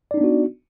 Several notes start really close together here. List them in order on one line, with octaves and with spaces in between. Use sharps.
D5 D#4 D4 B3 F#4